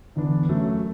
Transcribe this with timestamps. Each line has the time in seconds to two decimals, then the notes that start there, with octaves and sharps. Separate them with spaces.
0.16 E2 D3 B3 D4
0.49 F#2 F#3 A3